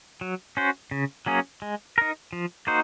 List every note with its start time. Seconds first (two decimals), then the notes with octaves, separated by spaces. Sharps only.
0.21 F#3
0.57 C#4 F#4 C5
0.91 C#3
1.26 F#3 A#3 C#4 G#4
1.62 G#3
1.98 D#4 A#4
2.33 F3
2.67 A#3 D#4 F#4 C5